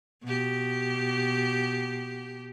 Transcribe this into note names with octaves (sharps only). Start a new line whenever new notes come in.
B2 G4